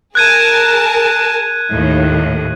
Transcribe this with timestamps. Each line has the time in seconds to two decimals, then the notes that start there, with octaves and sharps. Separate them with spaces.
0.15 G#4 A#4 A5 F#6 G#6 D#7
1.70 D#2 A2